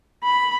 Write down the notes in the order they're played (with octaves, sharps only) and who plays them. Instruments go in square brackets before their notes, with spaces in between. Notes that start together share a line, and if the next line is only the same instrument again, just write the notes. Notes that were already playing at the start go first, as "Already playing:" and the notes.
[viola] B5